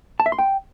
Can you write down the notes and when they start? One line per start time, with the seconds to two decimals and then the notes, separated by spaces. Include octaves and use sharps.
0.20 A5
0.26 E5
0.32 C6
0.38 G5